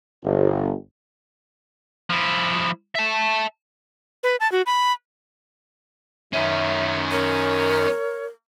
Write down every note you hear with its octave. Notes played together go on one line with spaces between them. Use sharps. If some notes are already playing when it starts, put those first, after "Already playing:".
G1
F3 E4
E5 A5
B4
A5
F#4
B5
F#2 D#3 C#4 B4 E5
A#4 C#5